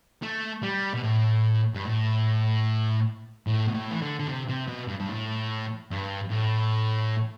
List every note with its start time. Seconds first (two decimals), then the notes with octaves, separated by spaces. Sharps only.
0.23 A3
0.63 G3
0.94 B2
1.03 A2
1.74 G2
1.85 A2
3.47 A2
3.68 B2
3.74 A2
3.91 E3
4.02 D3
4.19 D3
4.28 C3
4.49 C3
4.68 B2
4.89 G2
5.00 G2
5.09 A2
5.91 G2
6.31 A2